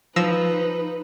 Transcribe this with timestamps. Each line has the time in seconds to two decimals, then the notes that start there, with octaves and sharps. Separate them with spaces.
0.16 F3 D#4 B4 E6 A#6